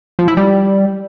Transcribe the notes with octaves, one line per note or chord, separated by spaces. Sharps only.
F3
E4
G3